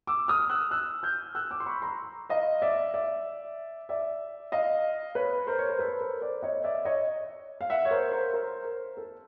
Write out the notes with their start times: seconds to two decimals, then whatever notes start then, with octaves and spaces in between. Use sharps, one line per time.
0.07 D6 E6
0.28 D#6 F6
0.50 E6 F#6
0.71 E6 F#6
1.03 F6 G6
1.35 E6 F#6
1.51 D6 E6
1.60 C6
1.66 B5 C#6
1.82 A#5 C6
2.30 D#5 F5
2.62 D5 E5
2.94 D5 E5
3.89 D5 E5
4.52 D#5 F5
5.15 B4 C#5
5.47 A#4 C5
5.58 C#5
5.69 C5
5.79 A4 B4
6.00 A#4 C5
6.21 C5 D5
6.43 C#5 D#5
6.64 D5 E5
6.85 C#5 D#5
7.61 F5
7.70 E5 F#5
7.85 C#5
7.91 A#4 C5
8.12 A#4 C5
8.33 A#4 C5
8.65 A#4
8.97 A4